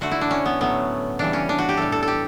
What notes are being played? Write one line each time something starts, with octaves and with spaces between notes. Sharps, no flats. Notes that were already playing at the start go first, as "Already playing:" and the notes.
D3 A3 F#4
E4
D4
C#4
B3
A2 F#3 A3 B3
C#3 E3 G3 D4
C#4
D4
F#4
G4
A2 G3 A4
A4
G4 A4